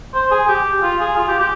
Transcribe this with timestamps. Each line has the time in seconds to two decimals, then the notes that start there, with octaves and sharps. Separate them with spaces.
0.14 C5
0.31 G#4
0.48 G4
0.82 F4
1.00 G#4
1.16 F4
1.28 G4
1.40 G4